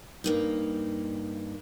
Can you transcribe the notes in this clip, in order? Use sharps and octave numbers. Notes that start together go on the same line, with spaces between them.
G2 A#3 D#4